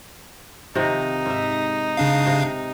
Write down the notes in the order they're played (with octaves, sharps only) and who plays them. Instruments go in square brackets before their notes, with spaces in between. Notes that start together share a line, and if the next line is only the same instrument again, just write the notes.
[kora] C3 D#3 F3 [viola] D#4
[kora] G#2 E5
[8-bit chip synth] C#3 D4 F5
[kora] C3